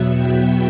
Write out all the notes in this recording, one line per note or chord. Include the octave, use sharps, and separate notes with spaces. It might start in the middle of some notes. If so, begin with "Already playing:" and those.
Already playing: E2 B2 F#3 B3 E5
G5